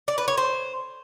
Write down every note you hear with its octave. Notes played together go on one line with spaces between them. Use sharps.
D5
B4
C#5
C5